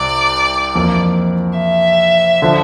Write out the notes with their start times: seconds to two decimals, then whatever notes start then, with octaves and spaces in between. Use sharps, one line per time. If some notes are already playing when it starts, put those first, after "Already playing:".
Already playing: C2 C3 D5
0.75 F2 E3 A#3
1.58 E5
2.42 D3 F3